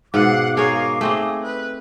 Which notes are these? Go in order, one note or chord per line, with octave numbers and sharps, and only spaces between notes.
G#2 B2 F5 F#5 D6
G#4 A#4 C#5
A3 C4 G#4 D#5
B4